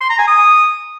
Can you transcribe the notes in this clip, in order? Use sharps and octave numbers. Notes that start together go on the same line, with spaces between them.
C6
A#5
G#5
D#6